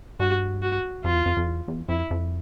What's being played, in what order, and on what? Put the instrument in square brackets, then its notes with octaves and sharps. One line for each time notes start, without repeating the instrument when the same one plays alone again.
[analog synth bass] G2 [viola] F#4
[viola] F#4
[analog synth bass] F2 [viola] F4
[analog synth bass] E2
F2
F2
E2
E2
[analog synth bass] F2 [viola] E4
[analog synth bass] F2